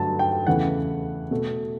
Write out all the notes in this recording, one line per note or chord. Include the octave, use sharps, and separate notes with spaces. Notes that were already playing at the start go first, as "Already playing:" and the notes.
Already playing: G2 D3 F#3 A3 A5
G5
E2 C#3 E3 A3 F#5
B2 A3